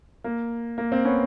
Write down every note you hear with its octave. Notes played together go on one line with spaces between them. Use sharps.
A#3
A#3
A#3 C4
B3 C#4